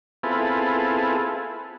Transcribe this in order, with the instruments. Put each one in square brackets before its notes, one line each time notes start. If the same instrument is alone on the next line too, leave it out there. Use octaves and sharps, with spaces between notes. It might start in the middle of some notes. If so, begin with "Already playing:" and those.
[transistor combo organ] B3 C4 E4 F4 G#4 A4